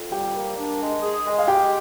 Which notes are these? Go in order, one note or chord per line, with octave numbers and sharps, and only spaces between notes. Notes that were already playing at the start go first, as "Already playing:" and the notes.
Already playing: F2
G3 G4 G5
A#3
D4
G#3
G#4
G#3
F5
G#3 G4 G5